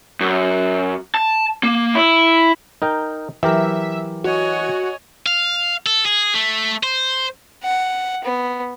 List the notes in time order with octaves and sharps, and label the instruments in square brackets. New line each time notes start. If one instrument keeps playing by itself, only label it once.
[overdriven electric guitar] F#2
A5
A#3
E4
[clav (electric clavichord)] D#4 A#4 G5
[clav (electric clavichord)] E3 G4 A#4 [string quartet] F#3 [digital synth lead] E5
[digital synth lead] F#4 [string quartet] C#5 D#5 G#5
[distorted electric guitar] F5
A4
G#4
A3
C5
[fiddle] F#5
B3